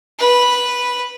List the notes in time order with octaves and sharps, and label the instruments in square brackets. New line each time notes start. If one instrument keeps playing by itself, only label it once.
[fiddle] B4